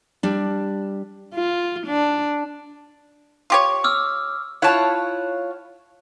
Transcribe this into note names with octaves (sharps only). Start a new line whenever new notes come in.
G3 D4
F4
D4
F4 G4 C#5
D6 E6 F6
E4 F4 C#5 F#5 A5